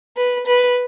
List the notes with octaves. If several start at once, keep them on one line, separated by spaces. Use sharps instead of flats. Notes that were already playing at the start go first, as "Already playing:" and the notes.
B4
B4